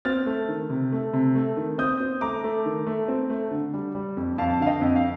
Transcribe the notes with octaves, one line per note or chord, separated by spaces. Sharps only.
C4 F6 A6
A3
D#3
C3
A3
C3
A3
D#3
C4 D#6 G6
C4
A3 A#5 D6
A3
D#3
A3
C4
A3
D3
G3
G3
F2
F2 F5 A5
D3 F5
D#5 G5
F2
F5